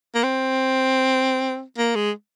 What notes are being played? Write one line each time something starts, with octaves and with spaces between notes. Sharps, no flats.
A#3
C4
A#3
G#3